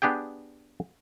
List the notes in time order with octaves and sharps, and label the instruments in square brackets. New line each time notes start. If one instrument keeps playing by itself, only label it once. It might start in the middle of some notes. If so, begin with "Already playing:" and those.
[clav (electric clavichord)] B3 D4 G4 G#4 G5